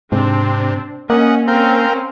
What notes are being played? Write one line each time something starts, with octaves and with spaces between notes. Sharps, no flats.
G#2 C3 C4 D4
A#3 C#4 D#5 F#5
C4 C#4 A#4 F5 G5